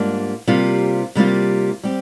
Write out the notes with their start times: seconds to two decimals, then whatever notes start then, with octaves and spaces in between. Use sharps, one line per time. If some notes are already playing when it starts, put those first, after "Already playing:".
Already playing: G#2 G3 A#3 D4 F4
0.48 C3 G3 A#3 F4
1.15 C3 G3 A#3 F4
1.84 G3 C4 G4